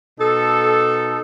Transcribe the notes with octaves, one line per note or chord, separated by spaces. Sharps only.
B2 D#4 A4